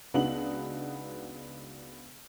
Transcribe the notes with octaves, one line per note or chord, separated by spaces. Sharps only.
C#2 B3 D4 D#4 F#4 F#7